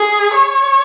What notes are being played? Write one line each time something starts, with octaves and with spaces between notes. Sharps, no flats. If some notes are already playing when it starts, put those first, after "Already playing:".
Already playing: G#4
C#5